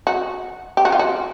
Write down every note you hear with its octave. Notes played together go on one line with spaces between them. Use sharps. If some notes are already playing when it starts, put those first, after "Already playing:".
F#4
G4
F#4
F4
F#4